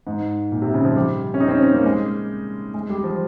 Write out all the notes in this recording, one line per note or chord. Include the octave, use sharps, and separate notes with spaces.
G#2
A#2
C3
C#3
F3
G3
C#4
D#4
C4
C#4
C#4
A#3
G#3
G#3
G3
F3